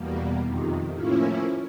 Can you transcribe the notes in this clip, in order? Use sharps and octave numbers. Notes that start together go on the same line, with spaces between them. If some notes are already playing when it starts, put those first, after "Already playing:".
Already playing: E2 B2 G3 A#3
F2 C3 D#3
A2 F3 A#3 C#4 E4